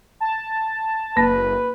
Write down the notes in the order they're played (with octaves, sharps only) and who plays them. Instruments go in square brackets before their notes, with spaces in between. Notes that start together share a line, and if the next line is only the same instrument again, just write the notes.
[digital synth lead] A5
[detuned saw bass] F#1 [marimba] A#3 [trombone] B4